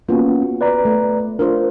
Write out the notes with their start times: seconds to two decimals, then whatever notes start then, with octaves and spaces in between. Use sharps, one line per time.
0.08 A#3 B3 C#4 F4 F#4
0.61 B4 D5 A#5
0.85 A3
1.39 D4 F4 A#4 C5